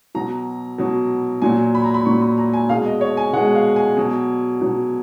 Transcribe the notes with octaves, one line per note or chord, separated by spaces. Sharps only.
B2 F#3 A#5
B2 F#3
A#2 F#3 G#5
B5
A#5
B5
A#2 F#3 C#6
B5
A#5
G#5
B2 G#3 F5
D#5
C#5
G#5
B2 G#3 F#5
F5
G#5
B2 F#3
B2 F#3